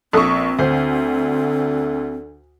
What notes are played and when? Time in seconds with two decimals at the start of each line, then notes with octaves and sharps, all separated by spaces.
0.13 A#1 C4 A4 C#6 D#6
0.59 D2 D3 C5